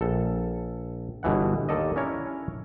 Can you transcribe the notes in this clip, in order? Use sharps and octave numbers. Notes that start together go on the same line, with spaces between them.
A#1 A4
G1 B2 E3 F#5
D#2 D#3 A4 D5 D#5
C#4 D4 E4 A#4 C#5